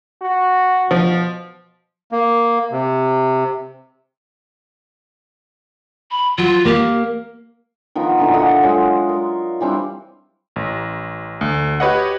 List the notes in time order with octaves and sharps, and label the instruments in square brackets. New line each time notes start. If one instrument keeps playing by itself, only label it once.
[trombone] F#4
[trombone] B2 [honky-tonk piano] F3
[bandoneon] A#3
C3
[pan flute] B5
[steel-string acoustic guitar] F#3 [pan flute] F4
[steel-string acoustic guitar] A#3 [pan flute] G4
[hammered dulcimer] D#3 F3 B3 A#5
A#2 D3 E3
F#4 A4 D#5
F#3 G#3 F4 F#5
A#4
E3 G3 C4 D4
[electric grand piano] A1
D2
F#4 G4 B4 C#5 D#5 F#5